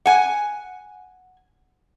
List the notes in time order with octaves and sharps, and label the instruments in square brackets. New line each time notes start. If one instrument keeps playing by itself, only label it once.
[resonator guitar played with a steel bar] F#5 G#5